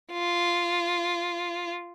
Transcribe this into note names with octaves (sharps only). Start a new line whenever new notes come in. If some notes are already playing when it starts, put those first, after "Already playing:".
F4